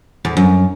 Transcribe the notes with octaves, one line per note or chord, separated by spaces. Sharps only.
E2
F#2